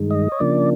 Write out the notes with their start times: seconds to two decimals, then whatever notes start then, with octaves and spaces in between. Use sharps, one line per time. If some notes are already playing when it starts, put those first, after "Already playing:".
Already playing: G2 D#3 G#3
0.10 D#5
0.32 C#5
0.39 C#3 F3 A#3 D4 D5